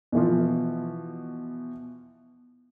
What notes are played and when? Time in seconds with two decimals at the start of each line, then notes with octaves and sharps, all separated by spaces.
0.12 B2 E3 F3